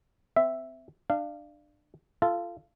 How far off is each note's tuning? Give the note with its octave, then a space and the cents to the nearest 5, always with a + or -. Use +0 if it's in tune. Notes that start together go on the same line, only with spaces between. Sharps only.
C4 -30 E5 +0
D4 +25 F5 -20
F4 -20 A4 +0